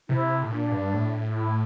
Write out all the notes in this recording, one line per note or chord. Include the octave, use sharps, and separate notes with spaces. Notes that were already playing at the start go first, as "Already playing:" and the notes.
C3 E4
A2
A#2 D4
G2
A2
E4